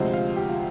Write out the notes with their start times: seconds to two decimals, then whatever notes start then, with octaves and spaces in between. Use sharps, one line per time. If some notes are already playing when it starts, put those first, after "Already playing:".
Already playing: D2 C3 F3 G#3 C5
0.13 F4
0.36 G4
0.49 F4